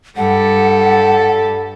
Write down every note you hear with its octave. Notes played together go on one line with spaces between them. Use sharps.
G2 G3 A4 F#5